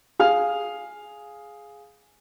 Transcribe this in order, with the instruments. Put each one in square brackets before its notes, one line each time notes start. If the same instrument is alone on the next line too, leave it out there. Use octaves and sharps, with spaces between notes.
[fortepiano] G#4 F5 F6